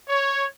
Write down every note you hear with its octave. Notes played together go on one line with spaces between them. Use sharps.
C#5